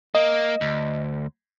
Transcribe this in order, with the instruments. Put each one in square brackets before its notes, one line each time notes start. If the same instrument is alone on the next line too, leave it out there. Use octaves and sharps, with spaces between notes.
[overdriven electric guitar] A#3 [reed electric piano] D#5
[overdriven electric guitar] D2